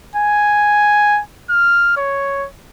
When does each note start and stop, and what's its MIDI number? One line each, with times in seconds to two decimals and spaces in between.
0.15 1.21 80
1.50 1.96 89
1.97 2.47 73